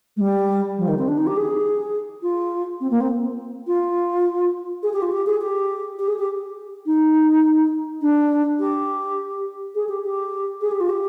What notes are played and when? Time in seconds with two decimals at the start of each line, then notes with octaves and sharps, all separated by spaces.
0.16 G#3
0.20 G3
0.78 F3
0.88 D#3
0.98 C4
1.08 D4
1.17 D#4
1.27 G4
1.37 G#4
2.22 F4
2.80 C4
2.90 A#3
3.00 C4
3.67 F4
4.83 G#4
4.93 G4
5.02 F4
5.12 G4
5.26 G#4
5.41 G4
5.98 G4
6.08 G#4
6.18 G4
6.86 D#4
8.01 D4
8.59 G4
9.75 G#4
9.89 G4
10.04 G4
10.61 G#4
10.71 G4
10.80 F4
10.89 G4